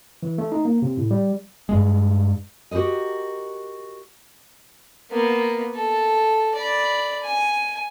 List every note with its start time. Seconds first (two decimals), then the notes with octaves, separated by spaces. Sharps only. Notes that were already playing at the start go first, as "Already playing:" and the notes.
0.23 E3
0.38 A3
0.52 D#4
0.65 A#3
0.82 C3
0.97 A2
1.11 G3
1.69 G2 G#3
2.71 F#4 G4 A#4 B4 D#5
5.11 A#3 B3
5.75 A4
6.55 D5 B5
7.23 G#5